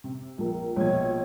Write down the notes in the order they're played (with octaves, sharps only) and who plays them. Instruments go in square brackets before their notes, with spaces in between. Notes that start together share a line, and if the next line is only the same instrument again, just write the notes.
[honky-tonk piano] C3
A#1 A#4
[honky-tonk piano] A#1 B2 G#6 [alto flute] C#5